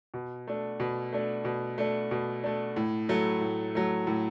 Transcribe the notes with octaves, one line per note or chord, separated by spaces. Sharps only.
B2
A3 D4
B2
A3 D4
B2
A3 D4
B2
A3 D4
A2
F#3 A3
A2
F#3 A3
A2